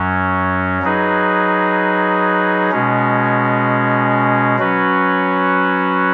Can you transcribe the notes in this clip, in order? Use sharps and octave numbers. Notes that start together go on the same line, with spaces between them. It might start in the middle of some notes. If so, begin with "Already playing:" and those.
Already playing: F#2 F#3 C#4
F#3 D#4 G#4 B4
B2 G#3 C#4
F#3 C#4 F#4 B4